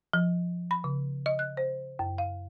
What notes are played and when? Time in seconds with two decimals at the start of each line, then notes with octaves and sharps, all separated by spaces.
0.13 F3
0.71 B5
0.84 C#3
1.26 D#5
1.39 F#6
1.57 C5
1.99 F#2
2.18 F5